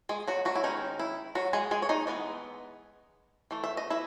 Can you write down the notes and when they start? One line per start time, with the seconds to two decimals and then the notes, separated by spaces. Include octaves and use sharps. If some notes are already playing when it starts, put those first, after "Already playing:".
0.09 G#3 G#4
0.28 F#3 F#4
0.45 F#3 F#4
0.55 E4
0.63 D#3 G#3 C#4 D#4
0.99 E4
1.35 F#3 F#4
1.53 G#3 G#4
1.71 G#3 G#4
1.82 C#5
1.89 D#4 D#5
2.07 E3 G#3 B3
3.51 E3 A3
3.64 E5
3.77 D#5
3.90 E4 E5